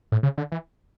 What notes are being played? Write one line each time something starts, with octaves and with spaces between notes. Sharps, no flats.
A2
C#3
D3
E3